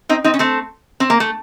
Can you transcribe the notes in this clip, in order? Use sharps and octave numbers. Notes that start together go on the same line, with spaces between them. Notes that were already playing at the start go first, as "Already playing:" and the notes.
C4 D#4
C4 D#4
C#4
A3 C4
C4
A#3
A3